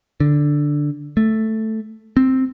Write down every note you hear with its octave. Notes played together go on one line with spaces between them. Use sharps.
D3
A3
C4